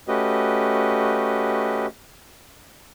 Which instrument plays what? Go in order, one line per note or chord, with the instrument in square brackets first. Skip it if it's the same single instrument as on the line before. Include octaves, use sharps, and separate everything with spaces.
[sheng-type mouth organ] A3 C#4 F#4 G4 B4 D#5